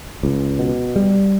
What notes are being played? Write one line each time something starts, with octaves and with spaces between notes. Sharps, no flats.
C#2
B2
G3